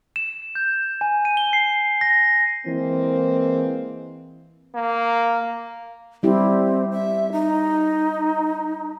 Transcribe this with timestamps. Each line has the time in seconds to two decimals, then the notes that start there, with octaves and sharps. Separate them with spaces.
0.16 E7
0.55 G6
1.01 G#5
1.25 D#7
1.37 G7
1.53 C7
2.01 A#6
2.66 E3 G#3 A#3 C4
4.75 A#3
6.23 G3 C4 E4 G4
6.92 E5
7.32 D#4